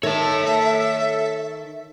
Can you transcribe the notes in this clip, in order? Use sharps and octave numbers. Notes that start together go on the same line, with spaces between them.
D#3 A4 C#5 E5 A5